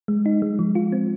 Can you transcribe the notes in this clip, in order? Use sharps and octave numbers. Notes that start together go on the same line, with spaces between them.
G#3
D#4
G#3
F3
F4
C4